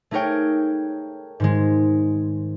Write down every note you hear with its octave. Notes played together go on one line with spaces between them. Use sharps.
A3 D#4 G#4 A#4 C#5 G5
G#2 D#3 G#3